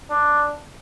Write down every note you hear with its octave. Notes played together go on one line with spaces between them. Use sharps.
D4